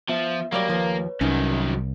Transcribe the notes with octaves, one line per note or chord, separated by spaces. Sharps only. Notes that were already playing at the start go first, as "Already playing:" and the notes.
F3 B3 E5
F#3 G3 A#3 D5 F5
D#2 F3 B4 C#5
C2 F#2 D#3 C#4 D#4